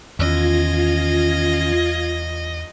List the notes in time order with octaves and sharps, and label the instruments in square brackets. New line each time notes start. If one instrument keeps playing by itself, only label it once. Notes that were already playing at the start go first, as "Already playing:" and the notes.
[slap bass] E2 [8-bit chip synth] D#3 C#4 [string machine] F4 G#6 A#6 [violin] D#5